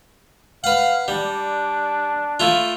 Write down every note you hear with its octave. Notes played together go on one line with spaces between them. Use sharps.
B4 F5 F#5
G3 D4
A3 E4 F4